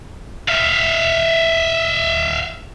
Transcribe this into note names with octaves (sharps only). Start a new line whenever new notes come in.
E5 F5